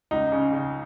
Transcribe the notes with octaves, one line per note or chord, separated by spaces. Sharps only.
C#2 D#4
C#3
C#3